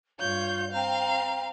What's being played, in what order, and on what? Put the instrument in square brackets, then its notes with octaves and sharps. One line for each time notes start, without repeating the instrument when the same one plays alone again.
[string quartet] G2 C#5 G6 [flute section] F4 F5
[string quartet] C4 F5 [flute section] G5 A#5